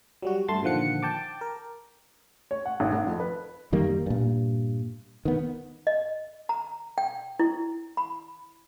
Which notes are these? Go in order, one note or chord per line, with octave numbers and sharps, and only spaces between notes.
F#3 G3 F#4
G2 A3 A5 C6 A6
A#2 D3 D#3 F3 F#5 C#7
G5 A5 D6
A#4
C#5
F#5
G#1
G#1
F2
B4
F#2 D#3 G3 A#3
G2 A#2
D#3 B3
D#5
A#5
G5
E4
B5